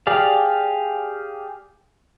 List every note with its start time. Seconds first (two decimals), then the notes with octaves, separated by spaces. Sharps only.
0.07 G4 G#4 D5 F5